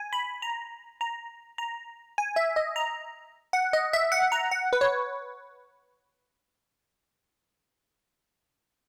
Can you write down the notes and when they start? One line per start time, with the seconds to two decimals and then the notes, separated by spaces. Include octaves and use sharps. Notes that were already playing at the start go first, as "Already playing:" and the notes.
Already playing: G#5
0.13 B5
0.42 A#5
1.01 A#5
1.58 A#5
2.18 G#5
2.36 E5
2.56 D#5
2.76 A#5
3.53 F#5
3.73 D#5
3.93 E5
4.12 F#5
4.32 A#5
4.51 F#5
4.73 B4
4.81 C#5